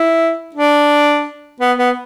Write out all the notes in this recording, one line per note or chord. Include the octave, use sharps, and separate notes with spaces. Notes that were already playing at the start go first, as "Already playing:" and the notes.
Already playing: E4
D4
B3
B3